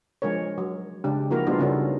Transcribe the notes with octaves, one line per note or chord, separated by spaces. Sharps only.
F3 G#3 D4 A#4 C#5
F#3
C#3 G#3 D4 G4
F3 A#3 E4 F#4 A#4
G3 A3 B3 D4 D#4 F4
C#3 B3 C#4 D#4 F#4 A4